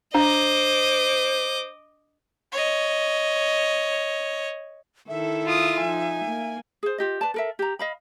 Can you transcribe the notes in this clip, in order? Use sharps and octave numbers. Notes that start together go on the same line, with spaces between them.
D4 C5 D#5 D6
C#5 D#5
D#3 E4 A4 E5
F4 D#6
F3 D#4 G#5
A#3
G#4 C5
F4 G4 D#5
B4 D5 A5
A4 A#4 E5
G4 A#5
D#5 F5 B5